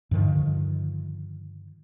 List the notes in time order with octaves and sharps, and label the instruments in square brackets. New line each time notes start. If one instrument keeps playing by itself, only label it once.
[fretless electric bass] G2 D3 D#3 F3